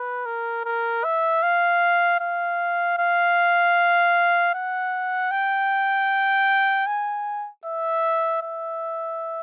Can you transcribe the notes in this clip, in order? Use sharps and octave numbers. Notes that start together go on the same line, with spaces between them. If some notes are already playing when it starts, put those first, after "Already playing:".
Already playing: B4
A#4
A#4
E5
F5
F5
F5
F#5
G5
G#5
E5
E5